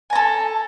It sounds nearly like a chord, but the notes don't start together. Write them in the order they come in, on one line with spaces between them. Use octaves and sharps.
G#5 A#5 A4